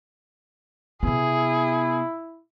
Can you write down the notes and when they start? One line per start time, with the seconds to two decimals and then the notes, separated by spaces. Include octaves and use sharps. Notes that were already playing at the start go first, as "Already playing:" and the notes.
1.03 C3 B3 E4 G#4